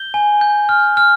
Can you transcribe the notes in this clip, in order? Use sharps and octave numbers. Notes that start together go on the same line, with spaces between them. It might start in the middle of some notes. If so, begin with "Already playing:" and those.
Already playing: G6 G7
G#5
G6
F6
F6